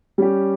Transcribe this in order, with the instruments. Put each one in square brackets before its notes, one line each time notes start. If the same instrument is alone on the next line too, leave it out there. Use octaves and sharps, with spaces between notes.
[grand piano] G3 C#4 G4